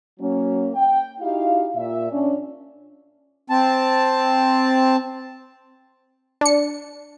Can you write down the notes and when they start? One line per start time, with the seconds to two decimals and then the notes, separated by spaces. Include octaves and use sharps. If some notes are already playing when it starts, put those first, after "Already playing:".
0.20 F#3 A#3 C#4
0.75 G5
1.21 D#4 E4 F#4 G4 F5
1.76 A#2 E5
2.12 C#4 D4
3.50 C4 A5
6.41 D4 C#7